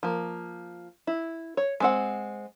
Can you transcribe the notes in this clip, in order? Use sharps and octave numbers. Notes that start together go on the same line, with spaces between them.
F3 A#3
E4
C#5
G#3 C4 F#5